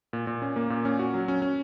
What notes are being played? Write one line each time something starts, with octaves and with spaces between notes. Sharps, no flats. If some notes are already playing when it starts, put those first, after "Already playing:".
A#2
A#2
C#4
A#3
A#2
C#4
F#4
F#3
C#4
C#4